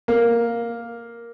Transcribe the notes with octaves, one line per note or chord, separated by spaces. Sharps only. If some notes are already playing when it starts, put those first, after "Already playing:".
A#3